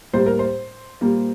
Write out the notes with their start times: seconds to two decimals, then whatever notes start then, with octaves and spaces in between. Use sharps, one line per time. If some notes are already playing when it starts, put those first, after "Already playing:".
0.13 A2 G3 A#3 C5
0.26 A#4
0.39 C5
1.01 A#2 G3 A#3